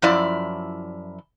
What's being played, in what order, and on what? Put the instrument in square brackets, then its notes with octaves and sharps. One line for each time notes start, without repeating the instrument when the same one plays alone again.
[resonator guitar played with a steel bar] F#2 F3 E4 D5